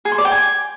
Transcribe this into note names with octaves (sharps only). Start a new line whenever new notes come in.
G#4
C6
D5
G5
G#5